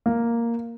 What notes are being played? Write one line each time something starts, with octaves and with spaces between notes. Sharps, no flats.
A#3